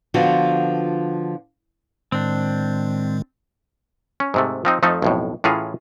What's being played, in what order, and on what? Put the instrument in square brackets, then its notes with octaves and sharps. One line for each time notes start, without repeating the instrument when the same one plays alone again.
[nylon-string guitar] D3 F3 B3 F4 F#4
[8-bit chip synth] A2 D#3 G#3 [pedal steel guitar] C4 D4
[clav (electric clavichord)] C#4
G#2 C3 A3
F3 C4 D#4
F2 F3 A3 D#4 A4
B1 F2 A2
A2 E3 C#4 F4 G#4 A#5